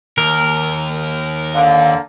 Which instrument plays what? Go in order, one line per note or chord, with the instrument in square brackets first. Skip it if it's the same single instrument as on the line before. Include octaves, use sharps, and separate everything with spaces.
[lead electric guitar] D#2 [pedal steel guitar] A#4
[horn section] D3 A#3 [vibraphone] F5